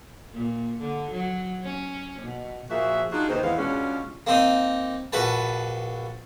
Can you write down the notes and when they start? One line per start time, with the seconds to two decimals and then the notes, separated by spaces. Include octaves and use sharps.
0.34 A#2
0.81 D3
1.12 F#3
1.63 C#4
2.22 B2
2.70 A#2 F3 A#3 F#4 G#4 E5
3.12 D4 D#4 F4 F#4 G#4
3.29 D#2 C3 C4 D#4 B4 C5
3.43 E2 E3 G#3 B3 F5
3.58 B2 G#3 C#4 D4 F4 G#4
4.27 A#3 C4 D#4
5.13 A#1 F#4 B4 A5